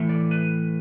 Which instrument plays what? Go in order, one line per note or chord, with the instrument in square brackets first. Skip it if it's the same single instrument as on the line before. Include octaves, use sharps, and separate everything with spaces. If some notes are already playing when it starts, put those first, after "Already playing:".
Already playing: [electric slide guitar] A2 E3 A3
D5
B4